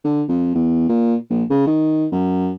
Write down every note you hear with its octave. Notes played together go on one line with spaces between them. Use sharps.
D3
F2
E2
A#2
A#1
C#3
D#3
F#2